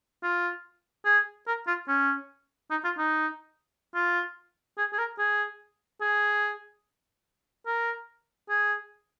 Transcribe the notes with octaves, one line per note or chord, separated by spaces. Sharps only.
F4
G#4
A#4
F4
C#4
D#4
F4
D#4
F4
G#4
G#4
A#4
G#4
G#4
A#4
G#4